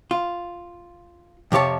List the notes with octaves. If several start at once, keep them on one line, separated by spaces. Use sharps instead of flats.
F4
F2 C3 G4 C#5 A5